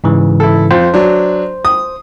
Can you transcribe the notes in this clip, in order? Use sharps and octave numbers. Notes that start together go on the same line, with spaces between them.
G#2 C#3 E3
E4 A4
F2 C5
F#3 D4
D#6